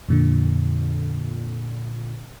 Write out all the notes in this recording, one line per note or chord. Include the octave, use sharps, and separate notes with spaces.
F2 A#2 D3